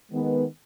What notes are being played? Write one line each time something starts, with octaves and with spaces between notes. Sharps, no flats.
D#3 G#3 B3